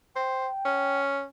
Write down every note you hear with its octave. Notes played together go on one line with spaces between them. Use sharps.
C5 G5
C#4